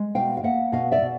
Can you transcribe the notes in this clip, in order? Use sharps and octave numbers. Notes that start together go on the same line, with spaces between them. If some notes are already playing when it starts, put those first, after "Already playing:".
Already playing: G#3
B2 F5 G5
F5
A#3 E5 F#5
B2 D#5 F5
D5 E5
B2